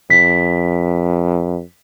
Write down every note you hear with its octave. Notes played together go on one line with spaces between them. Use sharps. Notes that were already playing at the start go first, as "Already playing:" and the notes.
F2 B6